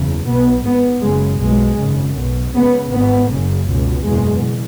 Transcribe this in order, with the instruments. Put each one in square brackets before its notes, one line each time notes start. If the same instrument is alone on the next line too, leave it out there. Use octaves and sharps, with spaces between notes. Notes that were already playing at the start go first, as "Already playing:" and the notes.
Already playing: [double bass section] F#1 E2 C#3
B1 B2 B3
G#1 G#2 B3
F#1 F#2 C#3 G#3
B1 B2 G#3
G#1 F#2 C#3
B1 B2
C#2 C#3 B3
G#1 G#2 B3
F#1 F#2 C#3
C#2 B2
F#1 E2 B2 G#3